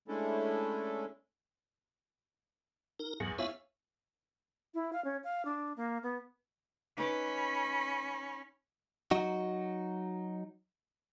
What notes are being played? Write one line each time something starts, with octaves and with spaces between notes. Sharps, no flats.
G#3 A3 C#4 D4 E4 A4
D#4 A#4
E2 G#2 F#3
B3 E4 F4 C#5 E5 F5
E4
F5
C#4
F5
D4
A#3
B3
C#4 D#4 B4 B5 D6
F#3 D#4 F#4